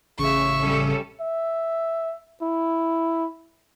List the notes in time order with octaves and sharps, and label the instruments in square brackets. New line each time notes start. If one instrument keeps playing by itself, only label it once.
[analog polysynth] A1 C#3 [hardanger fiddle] E5 C#6
[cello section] G3 C#4 A4
[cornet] E5
E4